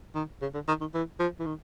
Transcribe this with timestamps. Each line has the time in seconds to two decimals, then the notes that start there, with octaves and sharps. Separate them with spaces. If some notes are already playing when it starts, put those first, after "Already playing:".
0.15 D#3
0.42 C#3
0.54 D3
0.68 D#3
0.81 D#3
0.94 E3
1.19 F3
1.40 E3
1.46 D#3